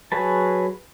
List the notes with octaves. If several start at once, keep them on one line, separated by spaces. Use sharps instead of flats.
F#3 F#4 G#4 B4 A5